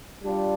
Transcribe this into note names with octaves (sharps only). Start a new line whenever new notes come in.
G3 D4 F4